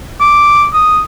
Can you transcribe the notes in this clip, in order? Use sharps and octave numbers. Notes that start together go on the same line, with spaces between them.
D6
D#6